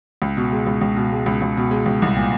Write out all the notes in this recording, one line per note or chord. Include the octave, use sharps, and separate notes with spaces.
C#2
B2
G#3
C#2
C#2
B2
G#3
C#2
C#2
B2
G#3
C#2
C2
A#2